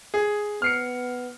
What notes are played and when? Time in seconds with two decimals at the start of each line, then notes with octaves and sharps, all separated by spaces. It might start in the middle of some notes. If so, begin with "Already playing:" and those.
0.14 G#4
0.62 B3 F6 C7 C#7